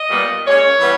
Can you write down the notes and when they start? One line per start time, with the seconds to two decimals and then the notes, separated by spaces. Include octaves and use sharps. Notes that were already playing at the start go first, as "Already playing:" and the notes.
Already playing: D#5
0.10 A#2 G3 B3
0.45 A#2 G#3 C#4 C#5
0.80 E3 G3 B3